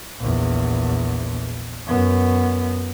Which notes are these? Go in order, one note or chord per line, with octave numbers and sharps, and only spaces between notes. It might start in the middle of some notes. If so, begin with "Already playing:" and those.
A#1 E2
F#2 B3